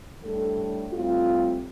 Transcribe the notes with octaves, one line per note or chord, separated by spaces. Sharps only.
A2 G3 D4 A4
A2 G3 C4 F4